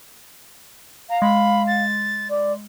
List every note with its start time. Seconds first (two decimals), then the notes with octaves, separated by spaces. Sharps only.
1.10 F5 A#5
1.22 G#3 B5
1.67 A6
2.30 D5